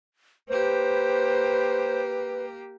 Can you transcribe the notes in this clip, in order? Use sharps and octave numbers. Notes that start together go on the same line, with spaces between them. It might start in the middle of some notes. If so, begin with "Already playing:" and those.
A#3 G4 B4 C5